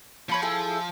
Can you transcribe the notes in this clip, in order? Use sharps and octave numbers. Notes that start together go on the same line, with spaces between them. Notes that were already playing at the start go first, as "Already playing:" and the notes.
F3 C#5 B5 C#6
E4 G#4 A4